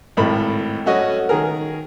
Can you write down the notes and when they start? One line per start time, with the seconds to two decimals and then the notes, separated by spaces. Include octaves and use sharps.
0.17 G#1 A2 A#4 B5
0.86 A3 C#4 F#4 D#5
1.29 D#3 G#4 A#4